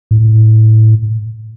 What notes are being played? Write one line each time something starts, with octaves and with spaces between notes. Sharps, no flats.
A2